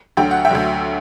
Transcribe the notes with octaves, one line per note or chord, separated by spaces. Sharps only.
D2 D3 F#3 G5
F#5
E5 G5
D2 D3 F#3